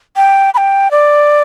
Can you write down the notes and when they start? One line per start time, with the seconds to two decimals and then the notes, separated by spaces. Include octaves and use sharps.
0.16 G5
0.54 B5
0.57 G5
0.91 D5